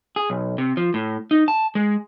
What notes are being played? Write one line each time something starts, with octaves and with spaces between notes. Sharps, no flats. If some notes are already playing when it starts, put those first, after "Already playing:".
G#4
B1
C3
F3
A2
D#4
A5
G#3